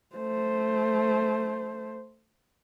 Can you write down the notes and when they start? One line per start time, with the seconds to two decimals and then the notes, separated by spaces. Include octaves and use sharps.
0.16 A3 C5